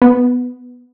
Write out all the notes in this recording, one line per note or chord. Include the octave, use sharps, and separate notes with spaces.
B3